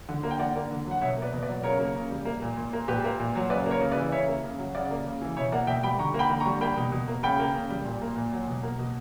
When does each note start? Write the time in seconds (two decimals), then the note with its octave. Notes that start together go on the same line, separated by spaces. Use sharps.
0.09 D3
0.23 A#3
0.31 G5
0.39 D3 D5 F#5
0.56 A#3
0.71 D3
0.86 F#3
0.91 F#5
1.01 B2 C#5 E5
1.17 A#3
1.22 B4 D5
1.33 B2
1.43 B4 D5
1.49 F#3
1.63 C#3 A#4 C#5
1.80 A#3
1.95 C#3
2.11 G3
2.25 A#3
2.42 A#2
2.57 A#2
2.73 A#3
2.88 A#2 G4 B4
3.04 A#3
3.19 A#2
3.35 F#3
3.50 C#3 B4 D5
3.66 A#3
3.71 A#4 C#5
3.81 C#3
3.91 B4 D5
3.97 E3
4.12 C#3 C#5 E5
4.28 A#3
4.44 C#3
4.58 F#3
4.74 C#3 D5 F#5
4.91 A#3
5.05 C#3
5.21 E3
5.37 B2 C#5 E5
5.52 A#3 D5 F#5
5.67 B2 E5 G5
5.83 G3 G5 B5
5.99 D3 A#5 C#6
6.14 A#3
6.19 G5 B5
6.30 D3
6.40 A#5 C#6
6.46 G3
6.61 A#3 G5 B5
6.77 B2
6.92 B2
7.08 A#3
7.23 C#3 G5 B5
7.39 A#3
7.54 C#3
7.70 G3
7.85 A#2
8.01 A#3
8.16 A#2
8.32 F#3
8.48 B2
8.63 A#3
8.79 B2